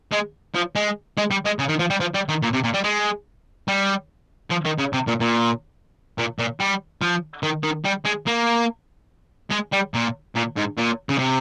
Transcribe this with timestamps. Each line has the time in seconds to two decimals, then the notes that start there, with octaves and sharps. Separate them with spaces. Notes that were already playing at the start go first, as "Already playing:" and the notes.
0.13 G#3
0.55 F3
0.75 G#3
1.18 G#3
1.31 G3
1.45 G#3
1.59 C#3
1.69 D#3
1.79 F3
1.90 G3
2.00 F3
2.15 G3
2.29 D#3
2.43 A#2
2.53 C3
2.64 A#2
2.74 G3
2.84 G#3
3.68 G3
4.51 F3
4.65 D#3
4.79 C#3
4.93 C3
5.07 A#2
5.20 A#2
6.18 A#2
6.39 A#2
6.60 G3
7.02 F3
7.43 D#3
7.64 D#3
7.85 G3
8.05 G#3
8.27 A#3
9.51 G#3
9.73 G3
9.94 A#2
10.35 A#2
10.56 G#2
10.77 A#2
11.09 C#3
11.18 C3